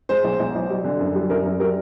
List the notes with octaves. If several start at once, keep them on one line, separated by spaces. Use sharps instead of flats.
G#3 C5
B1
B1
B1
G3
D3
F#2
G3
F#2 A#4
F#2
G3 A#4